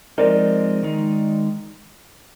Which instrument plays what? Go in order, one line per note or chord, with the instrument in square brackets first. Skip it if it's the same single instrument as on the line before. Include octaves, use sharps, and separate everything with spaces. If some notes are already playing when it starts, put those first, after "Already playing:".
[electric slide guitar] F3 G#3 C4 D#4 [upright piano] A#4 D5
[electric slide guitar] D#3 G#3 D#4